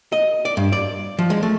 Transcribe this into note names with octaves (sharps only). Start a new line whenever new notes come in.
D#5
D5
G2
D5
F3
G#3
A3